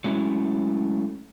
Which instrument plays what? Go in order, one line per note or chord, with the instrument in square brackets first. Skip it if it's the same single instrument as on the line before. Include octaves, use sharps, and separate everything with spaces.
[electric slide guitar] F#3 G#3 A3 C#4 E4